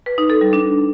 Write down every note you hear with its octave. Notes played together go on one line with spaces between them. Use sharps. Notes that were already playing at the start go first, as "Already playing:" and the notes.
B4
D#4
A4
G3
D4